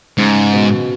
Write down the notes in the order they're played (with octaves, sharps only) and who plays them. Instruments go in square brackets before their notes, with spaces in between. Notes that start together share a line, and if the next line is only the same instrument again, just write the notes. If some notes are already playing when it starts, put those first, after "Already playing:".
[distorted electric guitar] G#2 [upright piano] C#3
[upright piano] B2